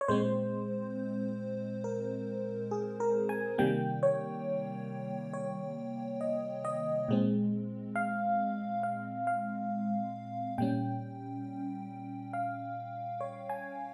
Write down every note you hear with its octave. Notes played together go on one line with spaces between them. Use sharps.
C#5
A#2 G#3 C4 C5
A#4
G#4
A#4
G#5
C3 D#3 G3 A#3 G5
C#5
C#5
D#5
D#5
A#2 G#3 C4
F5
F5
F5
A#2 G3 C#4 G5
F5
C#5
G#5